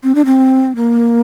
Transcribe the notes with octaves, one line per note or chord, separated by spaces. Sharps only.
C4
D4
C4
A#3